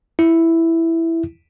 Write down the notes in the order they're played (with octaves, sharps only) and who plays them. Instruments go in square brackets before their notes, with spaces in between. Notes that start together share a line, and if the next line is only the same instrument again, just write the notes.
[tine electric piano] E4